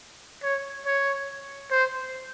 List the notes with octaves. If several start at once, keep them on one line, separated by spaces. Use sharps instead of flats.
C#5
C#5
C5